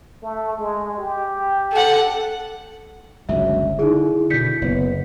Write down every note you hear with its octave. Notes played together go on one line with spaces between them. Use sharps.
A3
G#3
G4
A4 F#5
G1 C#2 F#3 E5
D3 D#4 E4 G#4
B2 D3 G6 B6 C#7
F#1 B3